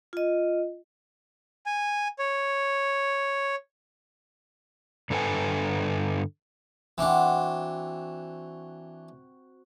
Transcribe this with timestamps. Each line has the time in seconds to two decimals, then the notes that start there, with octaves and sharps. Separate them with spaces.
0.13 F4 D#5
1.66 G#5
2.19 C#5
5.10 G2 D3 A4 B4 F#5 G#5
6.98 E3 C4 D4 F#4